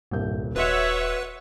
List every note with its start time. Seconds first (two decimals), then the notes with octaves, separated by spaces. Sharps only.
0.11 D#1 C2 G2 G6
0.56 D#1 F#4 B4 C#5 D#5 E5 F#5 C6